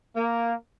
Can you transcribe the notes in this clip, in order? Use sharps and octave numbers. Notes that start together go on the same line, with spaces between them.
A#3